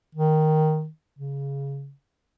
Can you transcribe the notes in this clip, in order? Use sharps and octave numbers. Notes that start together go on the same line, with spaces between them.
D#3
C#3